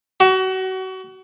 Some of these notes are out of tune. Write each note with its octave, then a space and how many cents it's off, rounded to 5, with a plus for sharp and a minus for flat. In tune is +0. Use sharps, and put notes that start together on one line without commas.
F#4 +30